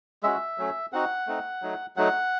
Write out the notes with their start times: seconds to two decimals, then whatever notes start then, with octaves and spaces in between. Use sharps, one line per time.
0.23 G#3 C#4 F#4 E5
0.58 F#3 A3 C#4
0.93 C4 D#4 F#4 F#5
1.27 A3 C4 D#4
1.62 F#3 A3 D#4
1.96 F#3 A3 D#4 F#5